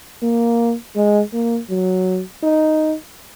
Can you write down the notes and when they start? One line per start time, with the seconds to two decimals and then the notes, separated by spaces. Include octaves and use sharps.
0.22 A#3
0.96 G#3
1.33 A#3
1.70 F#3
2.43 D#4